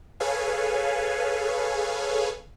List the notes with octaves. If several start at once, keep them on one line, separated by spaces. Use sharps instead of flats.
G#4 A4 B4 C#5 F5 G#5